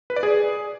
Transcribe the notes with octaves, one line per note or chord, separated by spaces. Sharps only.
B4
D5
G#4